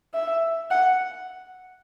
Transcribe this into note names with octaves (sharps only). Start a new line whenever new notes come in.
E5
F#5